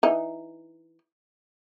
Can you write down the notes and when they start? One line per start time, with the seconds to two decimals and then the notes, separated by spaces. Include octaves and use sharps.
0.03 E3 D#4